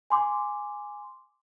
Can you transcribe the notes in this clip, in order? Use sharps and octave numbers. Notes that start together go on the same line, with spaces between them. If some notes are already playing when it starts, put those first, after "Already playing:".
G#5 C6 D6